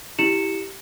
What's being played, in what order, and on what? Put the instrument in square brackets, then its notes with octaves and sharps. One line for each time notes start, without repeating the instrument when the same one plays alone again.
[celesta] E4 G4 C#7 E7 F#7